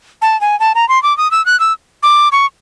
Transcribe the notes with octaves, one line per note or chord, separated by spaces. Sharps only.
A5
G#5
A5
A#5
C6
D6
D#6
E6
F#6
E6
D6
C#6